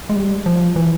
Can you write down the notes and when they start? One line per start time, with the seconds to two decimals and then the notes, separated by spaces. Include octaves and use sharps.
0.09 G#3
0.16 G3
0.46 F3
0.76 E3